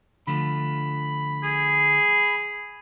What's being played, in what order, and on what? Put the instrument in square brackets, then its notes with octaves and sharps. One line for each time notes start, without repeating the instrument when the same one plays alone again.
[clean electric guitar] D3 F3 A3 [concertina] B5
[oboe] G#4